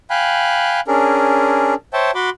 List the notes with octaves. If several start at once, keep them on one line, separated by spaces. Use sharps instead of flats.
F5 G5 G#5 B5 F#6
C#4 D4 G#4 A#4
C5 C#5 E5 G5 A5
F#4 B5 C6 D6